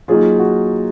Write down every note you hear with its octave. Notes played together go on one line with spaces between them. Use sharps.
F#3 A#3 D#4 F4 G#4
F#4